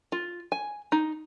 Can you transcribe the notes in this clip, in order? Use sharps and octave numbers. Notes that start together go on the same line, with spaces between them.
F4
G#5
D#4